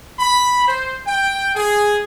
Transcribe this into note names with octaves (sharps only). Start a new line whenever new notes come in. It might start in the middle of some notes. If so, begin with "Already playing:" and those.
B5
C5
G5
G#4